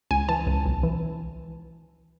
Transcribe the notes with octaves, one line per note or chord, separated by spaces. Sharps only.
C#2 G#5
E3 A5
C#2
B1
E3